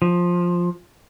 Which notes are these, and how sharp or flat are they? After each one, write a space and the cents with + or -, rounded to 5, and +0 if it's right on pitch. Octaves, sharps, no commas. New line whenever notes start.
F3 +10